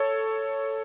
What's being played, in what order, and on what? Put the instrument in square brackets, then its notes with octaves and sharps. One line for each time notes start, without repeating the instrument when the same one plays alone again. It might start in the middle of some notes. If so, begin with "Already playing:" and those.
Already playing: [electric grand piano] A4 C#5